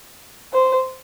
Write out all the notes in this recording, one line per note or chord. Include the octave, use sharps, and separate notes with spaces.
C5